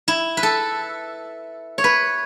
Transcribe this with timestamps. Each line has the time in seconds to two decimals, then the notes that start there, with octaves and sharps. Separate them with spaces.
0.08 E4
0.37 B4
0.43 A4
1.78 C#5
1.84 B4